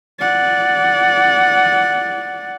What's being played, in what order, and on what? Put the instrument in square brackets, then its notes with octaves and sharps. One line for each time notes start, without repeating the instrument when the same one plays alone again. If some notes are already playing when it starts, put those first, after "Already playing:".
[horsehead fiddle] D5 F#5